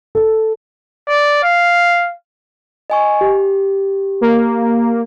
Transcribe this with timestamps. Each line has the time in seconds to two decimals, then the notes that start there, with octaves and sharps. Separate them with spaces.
0.15 A4
1.08 D5
1.43 F5
2.90 D#5 G#5 C#6
3.21 G4
4.21 A#3